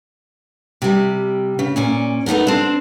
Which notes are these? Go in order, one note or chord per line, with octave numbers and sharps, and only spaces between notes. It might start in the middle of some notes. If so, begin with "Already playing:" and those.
C3 G3
C#3
A#2 C#4 D5
A3 B3 D#4 F#4 A#4
C4 D4